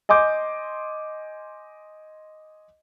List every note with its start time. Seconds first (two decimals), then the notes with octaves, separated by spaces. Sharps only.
0.09 D#5 G#5 C6 D6 G6